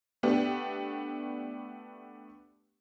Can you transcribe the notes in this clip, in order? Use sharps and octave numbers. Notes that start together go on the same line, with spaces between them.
A3 B3 D4 G4